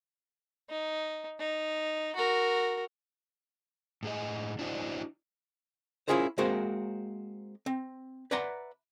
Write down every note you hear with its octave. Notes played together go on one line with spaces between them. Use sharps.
D#4
D#4
F#4 A#4
A2 G#4 D#5
D4 E4 F#4 B4 C5 D#5
C#4 E4 F4 G#4 A#4 C5
G#3 A#3 C4 F#4 A#4 C5
C4
B4 D5 E5 F#5 A#5 C6